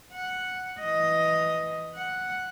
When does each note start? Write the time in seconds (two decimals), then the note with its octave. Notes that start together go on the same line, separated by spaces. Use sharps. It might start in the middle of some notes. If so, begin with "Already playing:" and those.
0.13 F#5
0.80 E3 D#5
1.94 F#5